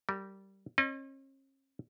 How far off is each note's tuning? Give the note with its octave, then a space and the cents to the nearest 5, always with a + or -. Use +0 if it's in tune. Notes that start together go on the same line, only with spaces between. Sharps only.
G3 -15 A#4 -30
C#4 -45 D#5 -40